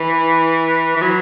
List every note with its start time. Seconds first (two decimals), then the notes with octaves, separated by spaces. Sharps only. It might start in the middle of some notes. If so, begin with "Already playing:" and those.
Already playing: E3
0.96 E3
1.01 F#3